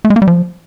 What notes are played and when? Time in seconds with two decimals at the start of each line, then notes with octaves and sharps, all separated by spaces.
0.05 A3
0.10 G#3
0.16 A#3
0.22 G3
0.28 F3